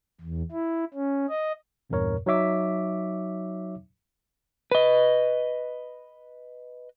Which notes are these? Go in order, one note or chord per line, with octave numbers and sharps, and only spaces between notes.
E2
E4
C#4
D#5
G1 E2 G2 A#2 A#4 C#5
F#3 D#4 C#5 E5 D6 B6
B4 D#5